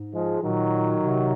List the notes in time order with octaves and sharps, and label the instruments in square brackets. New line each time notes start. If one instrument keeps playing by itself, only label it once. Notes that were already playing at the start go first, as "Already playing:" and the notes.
Already playing: [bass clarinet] G#2
[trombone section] F3 G#3
[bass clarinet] A#2 [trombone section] D#3 F#3
[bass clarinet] C3